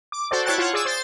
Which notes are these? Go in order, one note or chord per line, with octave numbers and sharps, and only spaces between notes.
D6
F#4 A4 C5 D5
E4 C#5 G5 A5 F#6 A6
F4 C#5 F#5
G#4 D5 E6
C5 A6